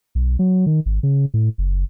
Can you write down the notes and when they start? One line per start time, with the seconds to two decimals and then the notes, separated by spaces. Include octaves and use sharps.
0.15 B1
0.39 F#3
0.66 D#3
0.86 G#1
1.03 C#3
1.34 A2
1.58 F#1